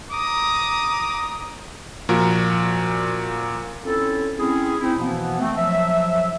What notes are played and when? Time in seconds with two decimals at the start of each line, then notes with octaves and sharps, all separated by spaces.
0.11 A#5 D6 D#6
2.09 A#2 F3 F#4 A#4
3.83 C4 C#4 E4 F4 A4
4.38 C4 C#4 E4 G#4
4.80 C4 D#4 E4
4.98 B2 E3 F3 A#3 B3
5.40 A3 C4
5.57 F3 F#3 E5